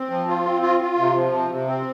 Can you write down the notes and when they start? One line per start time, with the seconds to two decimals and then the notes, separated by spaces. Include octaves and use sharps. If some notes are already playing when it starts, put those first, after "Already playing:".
Already playing: C4
0.10 F3
0.27 F4
0.45 C4
0.62 F4
0.80 F4
0.98 C3
1.15 F3
1.32 C3
1.50 C3
1.67 C4